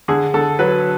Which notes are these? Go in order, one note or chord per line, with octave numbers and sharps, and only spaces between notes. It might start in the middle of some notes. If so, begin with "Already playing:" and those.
D3 G#4
D3 A4
F#3 B4